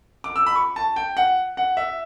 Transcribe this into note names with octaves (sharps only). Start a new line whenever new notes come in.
D6
E6
B5
C#6
A5
G5
F#5
F#5
E5